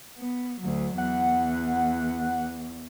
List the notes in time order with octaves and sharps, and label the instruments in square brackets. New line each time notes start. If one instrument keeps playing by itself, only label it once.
[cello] B3
D2 F#3
[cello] E2 [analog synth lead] F#5